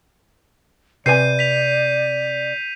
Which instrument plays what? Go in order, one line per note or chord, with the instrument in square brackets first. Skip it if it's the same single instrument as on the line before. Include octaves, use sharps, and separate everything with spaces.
[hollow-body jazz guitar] C3 B4 G#5 [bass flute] D5 [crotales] G6 C7 D#7
[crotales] B6 F7